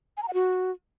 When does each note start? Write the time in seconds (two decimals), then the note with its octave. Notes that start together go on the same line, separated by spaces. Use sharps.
0.17 G#5
0.23 A#5
0.28 F#5
0.34 F#4